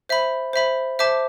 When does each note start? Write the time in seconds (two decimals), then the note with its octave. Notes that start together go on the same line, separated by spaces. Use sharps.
0.09 C5 E5 B5
0.53 C5 E5 B5
0.99 C5 E5 A5 D6